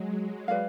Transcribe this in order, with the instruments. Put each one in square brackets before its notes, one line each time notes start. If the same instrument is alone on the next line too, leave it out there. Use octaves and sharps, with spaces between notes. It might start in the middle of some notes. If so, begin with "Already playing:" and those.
Already playing: [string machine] F#3 G#3
[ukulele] B4 D5 F5